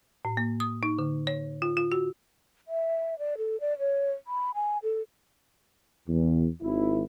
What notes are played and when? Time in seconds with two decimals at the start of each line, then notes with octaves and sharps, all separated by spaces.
0.25 A2
0.37 A#3
0.60 D#6
0.83 D#4
0.99 D3
1.27 C#5
1.62 F4
1.77 F4
1.92 F#4
2.68 E5
3.19 D5
3.38 A4
3.60 D5
3.79 C#5
4.27 B5
4.55 G#5
4.83 A4
6.08 E2
6.62 G#1 E4